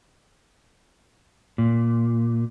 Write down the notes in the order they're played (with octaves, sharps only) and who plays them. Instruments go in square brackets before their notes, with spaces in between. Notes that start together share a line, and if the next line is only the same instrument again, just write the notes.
[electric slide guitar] A#2